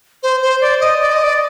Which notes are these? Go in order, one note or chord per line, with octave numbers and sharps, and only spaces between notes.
C5
C5
D5
D#5
D5
D#5
D5